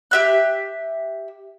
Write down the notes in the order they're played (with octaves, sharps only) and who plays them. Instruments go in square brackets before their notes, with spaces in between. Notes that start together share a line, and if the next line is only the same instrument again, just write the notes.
[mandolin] G4 E5 F#6